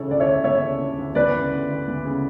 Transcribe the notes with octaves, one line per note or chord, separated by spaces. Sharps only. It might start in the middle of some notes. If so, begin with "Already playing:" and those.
Already playing: C#3 E3 A4 C#5
D2 D5
C#5 E5
D2
E3 C#5 E5
C#3
D2
D2
E3 B4 D5
C#3
D2
D2
E3
C#3